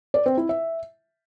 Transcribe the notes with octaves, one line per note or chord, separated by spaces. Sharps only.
D5
C4
E4
E5